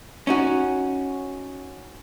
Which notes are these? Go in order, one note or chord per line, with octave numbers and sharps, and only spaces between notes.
C#4 D#4 F#4